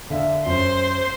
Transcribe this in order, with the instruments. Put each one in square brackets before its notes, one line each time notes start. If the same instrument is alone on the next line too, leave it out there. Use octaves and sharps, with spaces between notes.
[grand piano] D3 E5 F5
[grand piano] F#2 [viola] C5 C6